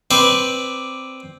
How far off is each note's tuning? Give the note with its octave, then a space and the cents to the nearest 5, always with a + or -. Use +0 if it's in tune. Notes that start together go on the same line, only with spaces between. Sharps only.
C4 +0 B4 +0 D5 +0